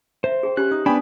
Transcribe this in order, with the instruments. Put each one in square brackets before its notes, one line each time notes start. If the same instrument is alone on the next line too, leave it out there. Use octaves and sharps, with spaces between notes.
[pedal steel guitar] C5 [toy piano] E5 F5
[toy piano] G#4 G5
[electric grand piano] C#4 [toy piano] G4 C#5 C6 [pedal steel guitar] F#6
[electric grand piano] D#4 [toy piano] D#6
[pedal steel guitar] B3 D4 [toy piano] C5 C#6 D#6 [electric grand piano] G5 G#5 B5